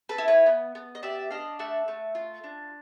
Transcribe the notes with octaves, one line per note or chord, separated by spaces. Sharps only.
A4 B4
E4
B4 C#5
B3
B3
D#5
G4 D5 E5
D4 D#5 F5
A3 E5 F#5
A3
F4
D4